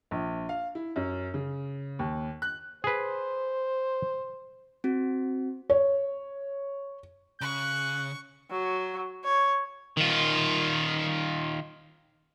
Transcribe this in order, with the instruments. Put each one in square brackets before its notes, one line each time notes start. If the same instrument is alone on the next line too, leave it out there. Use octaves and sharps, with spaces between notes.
[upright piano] A#1
F5
E4
F#2
C#3
D#2
F#6
[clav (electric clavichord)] G#4 B4 [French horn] C5
[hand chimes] C4 F#4
[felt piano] C#5
[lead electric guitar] C#3 [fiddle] C#6 [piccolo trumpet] F#6
[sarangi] F#3
C#5
[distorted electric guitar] D#3 F4